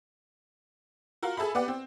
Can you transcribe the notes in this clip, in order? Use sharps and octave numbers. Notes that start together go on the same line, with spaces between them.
F4 F#4 A#4 F5
G#4 A4 E5 B5
B3 G4 D5 F#5
C4